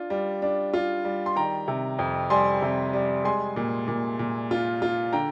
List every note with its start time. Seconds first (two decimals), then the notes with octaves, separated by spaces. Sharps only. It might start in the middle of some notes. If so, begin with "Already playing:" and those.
Already playing: D4 F4
0.10 G3
0.42 D4
0.74 F4
1.05 G3
1.26 C6
1.36 D#3 G5 A#5
1.68 C3
1.99 F2
2.30 G3 G#5 C6
2.62 C3
2.93 G3
3.24 G#3 G#5 C6
3.56 A#2
3.88 A#2
4.19 A#2
4.51 F4
4.82 F4
5.13 D3 G5 A#5